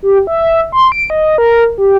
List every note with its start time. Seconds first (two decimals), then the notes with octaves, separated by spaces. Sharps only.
0.03 G4
0.27 E5
0.72 C6
0.92 D7
1.10 D#5
1.38 A#4
1.78 G4